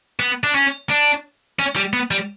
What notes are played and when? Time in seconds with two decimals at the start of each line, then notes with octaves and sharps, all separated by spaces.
0.20 B3
0.43 D4
0.55 C#4
0.89 D4
1.59 C#4
1.76 G3
1.93 B3
2.11 G3